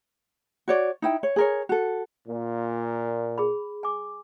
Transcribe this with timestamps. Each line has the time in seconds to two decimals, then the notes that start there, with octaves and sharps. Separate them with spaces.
0.68 F#4 C#5 D5
1.02 D#4 E4 G5
1.23 C#5
1.36 G#4 A#4 C#5
1.69 F#4 A4
2.28 A#2
3.38 G#4 B5
3.83 G#5 D6